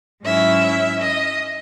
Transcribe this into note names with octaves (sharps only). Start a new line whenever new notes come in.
G#2 F#3 C#4 E4 E5
D#5